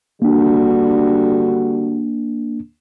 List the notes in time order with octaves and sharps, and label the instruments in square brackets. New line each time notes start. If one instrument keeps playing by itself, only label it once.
[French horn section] D3 G3 F#4 [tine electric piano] A#3 D4